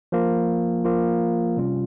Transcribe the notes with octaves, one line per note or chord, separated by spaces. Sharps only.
F3 A#3 F4
F3 A#3 F4
C3 G3 C#4 F4